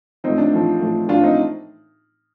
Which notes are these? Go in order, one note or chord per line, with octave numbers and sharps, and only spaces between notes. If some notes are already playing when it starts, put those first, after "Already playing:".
A2 F3 C4 D#4
D4
A2 F3
A2 F3
A2 F3 D4 F4
C4 D#4